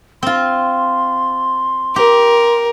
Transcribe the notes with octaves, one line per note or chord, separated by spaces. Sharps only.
C4 F4 C6
G4 A#4